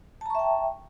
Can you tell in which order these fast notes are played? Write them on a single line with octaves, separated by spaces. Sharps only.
A5 A#5 C#6 E5 G5